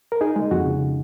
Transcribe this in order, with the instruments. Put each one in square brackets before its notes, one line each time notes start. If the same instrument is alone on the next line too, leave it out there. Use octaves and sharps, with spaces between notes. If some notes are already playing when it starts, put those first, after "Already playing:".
[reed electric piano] A#4
D#4 G#4
G#3
F2 F#4
C#3